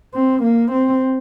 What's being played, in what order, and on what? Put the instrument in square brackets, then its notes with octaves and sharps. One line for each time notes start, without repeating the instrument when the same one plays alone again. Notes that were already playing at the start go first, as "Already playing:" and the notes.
[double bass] C4
A#3
C4